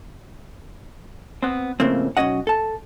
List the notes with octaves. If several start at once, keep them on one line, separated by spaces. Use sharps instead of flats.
B3 C4
F2 A2 C#3 A#3 C4
B1 C#3 C#4 F#4 D#5 F#5
A4 A5